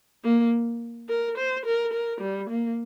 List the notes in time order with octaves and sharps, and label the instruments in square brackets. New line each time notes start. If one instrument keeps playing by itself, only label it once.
[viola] A#3
A#4
C5
A#4
A#4
G3
A#3